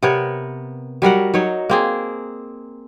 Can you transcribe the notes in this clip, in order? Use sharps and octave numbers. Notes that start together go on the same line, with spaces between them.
C3 B3 A#4 C#5
F#3 G3 A#4 F#5
F#3 D#4 C#5
A#3 C4 G#4